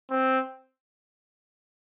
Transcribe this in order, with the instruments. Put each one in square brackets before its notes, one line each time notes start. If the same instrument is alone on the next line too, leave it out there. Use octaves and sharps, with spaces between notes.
[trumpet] C4